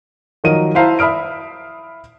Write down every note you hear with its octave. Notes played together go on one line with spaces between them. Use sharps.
D#3 F3 F#3 A#4 D#5 D#7
E4 C5 F5 A5 A#5
E5 B5 D#6 F6 D7